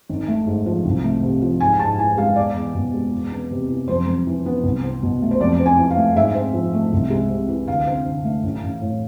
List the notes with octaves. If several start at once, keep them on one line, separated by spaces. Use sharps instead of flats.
G#1
A3
G#2
F3
C2
A3
C3
F3
G#2 G#5
G#2 A5
E3 G#5
G#3 F5
E2 D5
E2
B2
G#3
E2
B3
C3
E3
F2 C5
F2
E3
B3
C2
C4
B2
A3
C5
F2 D5
C4
G#5
E3
F5
A3
G#2 E5
C4
F3
A3
C2
G#3
C3
E3
D2 F5
C4
D3
A3
A1
A1
A2